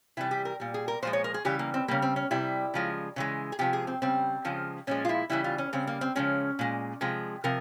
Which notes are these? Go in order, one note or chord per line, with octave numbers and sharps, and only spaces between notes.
C3 E3 G3 E4
G4
A#4
A#2 G3
G#4
A#4
A#2 F3 G#3 C5
C#5
A#4
G#4
C#3 E3 G3 G4
A#3
C4
C#3 G3 A#3
C4
C#4
C3 G3 E4
C#3 F3 G#3
C#3 E3 G#3
G#4
C3 F3 G#3 G4
G#4
C4
C#3 G3 C4
C#3 F3 G#3
A#2 F3 G#3 C#4
F4
E4
C#3 E3 G3 E4
F4
C#4
C#3 G3 C4
A#3
C4
C#3 F3 G#3 C#4
A#2 G#3
C3 F3 G#3
C3 F3 A#4